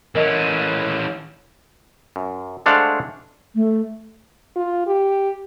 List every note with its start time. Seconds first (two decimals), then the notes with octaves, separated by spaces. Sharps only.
0.15 E3 C#4 A#4 D#5
2.16 F#2
2.66 G#3 A3 D4 C5 F5 F#5
3.55 A3
4.56 F4
4.86 G4